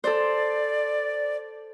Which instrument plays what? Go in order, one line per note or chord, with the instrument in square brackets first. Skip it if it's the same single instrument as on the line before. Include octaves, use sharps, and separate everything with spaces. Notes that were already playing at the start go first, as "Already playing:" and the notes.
[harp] A4 C5 [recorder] D5